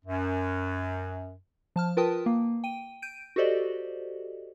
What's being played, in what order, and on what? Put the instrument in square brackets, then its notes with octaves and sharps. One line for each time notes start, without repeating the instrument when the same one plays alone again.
[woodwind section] F#2
[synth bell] F3 A5 F6
F4 A#4 B4 G5 A5 D#6
A#3
G5 D#7
G6 D7 D#7
F#4 G4 A4 C5 D5 D#5